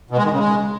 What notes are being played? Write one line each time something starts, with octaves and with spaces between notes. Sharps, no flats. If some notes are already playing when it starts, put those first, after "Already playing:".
B2
G#3
D#3
C#3
G#3